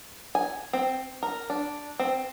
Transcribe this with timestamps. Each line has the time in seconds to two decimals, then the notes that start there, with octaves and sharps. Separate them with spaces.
0.35 G#5
0.73 C4
1.23 A#4
1.50 D4
1.99 C4